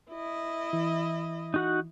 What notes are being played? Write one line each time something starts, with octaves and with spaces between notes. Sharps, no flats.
E4 D#5
E3
D#4 F#4 F#5